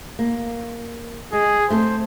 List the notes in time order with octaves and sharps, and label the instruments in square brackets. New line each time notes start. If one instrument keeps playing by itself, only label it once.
[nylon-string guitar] A#3
[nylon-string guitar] G#3 [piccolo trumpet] G#4
[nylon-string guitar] A3 C4 A4 [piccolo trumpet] C5